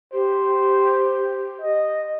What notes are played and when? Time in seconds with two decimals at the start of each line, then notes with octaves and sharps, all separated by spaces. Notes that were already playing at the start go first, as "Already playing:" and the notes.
0.13 G4 C5
1.61 D#5